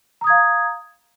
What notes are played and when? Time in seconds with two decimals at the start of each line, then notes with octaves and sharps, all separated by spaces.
0.21 A#5
0.24 D#6
0.27 G#6
0.30 F5